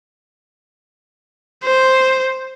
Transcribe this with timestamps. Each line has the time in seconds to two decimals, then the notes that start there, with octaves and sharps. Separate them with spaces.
1.64 C5